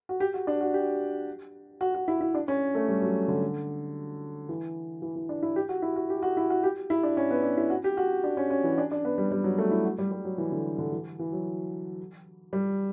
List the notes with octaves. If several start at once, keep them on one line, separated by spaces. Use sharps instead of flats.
F#4
G4
F#4
D4
F#4
G4
F#4
F#4
E4
E4
D4
C#4
A3
G3
F#3
D3
E3
E3
E3
D4
E4
G4
F#4
E4
F#4
G4
F#4
E4
F#4
G4
E4
D4
C#4
B3
D4
E4
F#4
G4
F#4
D4
C#4
C#4
E3
D4
D4
B3
G3
G3
F#3
A3
E4
F#4
G3
G3
F#3
E3
D3
D3
E3
E3
F#3
G3